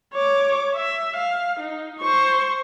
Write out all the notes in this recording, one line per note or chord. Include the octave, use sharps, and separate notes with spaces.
C#5 D6
E5
F5
D#4
C5 C#6